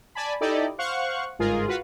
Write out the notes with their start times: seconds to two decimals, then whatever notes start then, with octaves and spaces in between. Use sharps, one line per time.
0.15 D5 G#5 A5 B5
0.41 D#4 E4 G4 A4 D5 D#5
0.78 C5 F5 F#5 C#6 F#6
1.39 G1 G#2 F4 G#4 A#4
1.67 F4 F#4 B4 F5 F#5